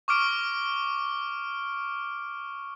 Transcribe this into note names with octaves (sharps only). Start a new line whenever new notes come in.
C#6 D6 F6 D7